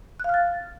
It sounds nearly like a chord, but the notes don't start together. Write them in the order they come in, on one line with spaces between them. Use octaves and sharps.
F#6 F5 F6 A6